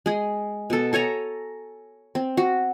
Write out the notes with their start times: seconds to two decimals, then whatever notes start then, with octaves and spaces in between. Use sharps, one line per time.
0.06 G#3 G#4
0.70 B2 A4
0.93 A4 C#5 G#5 A#5
2.15 C4
2.37 F#4